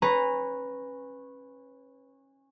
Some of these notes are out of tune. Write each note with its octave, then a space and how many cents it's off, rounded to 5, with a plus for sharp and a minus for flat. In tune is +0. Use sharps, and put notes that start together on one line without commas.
C#4 -25 B4 +0 A#5 +0